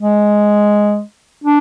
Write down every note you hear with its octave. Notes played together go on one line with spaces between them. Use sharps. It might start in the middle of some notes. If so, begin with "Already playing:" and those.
G#3
D4